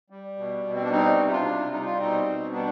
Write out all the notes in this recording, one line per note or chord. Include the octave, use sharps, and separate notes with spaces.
G3
B2
B2
C4
D4
G3 C4 D#4
C3
D#4
D4 F4
C3
G3 D#4
F4
B2 C4 D#4
B2
G3 B3 D4